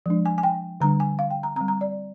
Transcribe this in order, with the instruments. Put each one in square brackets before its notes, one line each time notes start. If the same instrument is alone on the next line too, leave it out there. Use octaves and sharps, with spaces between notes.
[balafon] F3 G#3 D4
G#5
G#5
G5
D3 G3 D4 A#5
G#5
F5
G5
A#5
C4 A#5
G3
A#5
D5